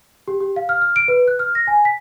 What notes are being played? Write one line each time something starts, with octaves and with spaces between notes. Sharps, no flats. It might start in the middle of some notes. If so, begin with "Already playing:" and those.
G4
G4
F5
F6
F6
D7
B4
F#6
F6
A#6
G#5
B6